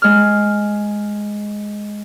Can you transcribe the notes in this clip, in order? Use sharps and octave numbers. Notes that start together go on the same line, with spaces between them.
G#3 F6